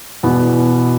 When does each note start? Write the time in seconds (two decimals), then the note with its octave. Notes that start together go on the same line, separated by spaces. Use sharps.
0.23 E2 B2 B3